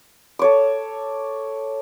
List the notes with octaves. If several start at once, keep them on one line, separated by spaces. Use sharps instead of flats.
A4 C#5 D6